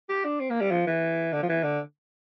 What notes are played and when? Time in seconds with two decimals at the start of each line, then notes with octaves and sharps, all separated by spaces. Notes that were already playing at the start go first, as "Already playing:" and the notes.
0.09 G4
0.24 D4
0.40 C4
0.50 A#3
0.61 G3
0.71 F3
0.87 E3
1.33 D3
1.42 F3
1.49 E3
1.63 D3